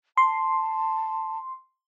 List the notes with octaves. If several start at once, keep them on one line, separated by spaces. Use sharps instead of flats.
A5 C6